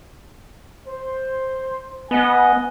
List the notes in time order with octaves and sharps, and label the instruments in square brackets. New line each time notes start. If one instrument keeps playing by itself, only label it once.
[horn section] C5
[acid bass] B3 [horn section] D#5 F#5 G#5